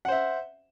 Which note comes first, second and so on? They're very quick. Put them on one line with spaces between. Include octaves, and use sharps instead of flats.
F#5 C5 E5